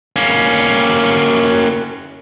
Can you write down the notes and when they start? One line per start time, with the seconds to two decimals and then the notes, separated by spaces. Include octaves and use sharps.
0.16 A#3 C#4